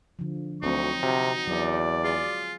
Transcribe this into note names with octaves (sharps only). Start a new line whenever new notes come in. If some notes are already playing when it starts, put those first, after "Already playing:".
D3 F3
D2 F#3 C4 D#4 C#6
C3 F#4 A#5
E2 F#3 D5
F4 G#4